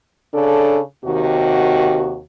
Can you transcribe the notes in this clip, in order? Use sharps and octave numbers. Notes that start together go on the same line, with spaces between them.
C#3 D4 A4
D#2 C3 D#3 F#4